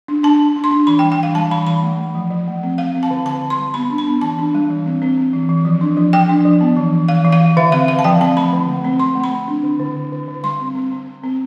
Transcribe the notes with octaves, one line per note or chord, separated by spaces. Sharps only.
D4
D4 A5
D4
D4
C6
D4
E3 B5
G5
G3
G5
E3 F5
G3 A5
E3 B5
E3 B5
A3
A3
F3
F3
A3
C4
C4 F5
C4
A5
D3
D3 A5
D3
C6
G3
B3 B5
D4
B5
B3
E3 A5
D4
G3
E3
C4
C4
C4
E3
E3
F3
D4
F3
F3 G5
D4
F3
B3
E3
E3
E3 F5
E3
F5
E3
D3 E5
C4 F5
D3 F5
A5
F3 G5
C4 A5
A3 B5
D3
A3
C4
C4 C6
A3
B5
C4
D4
D3
D3
D3
D3
D3
G3 C6
C4
C4
C4
C4
C4